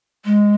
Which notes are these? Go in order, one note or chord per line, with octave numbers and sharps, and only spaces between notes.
G#3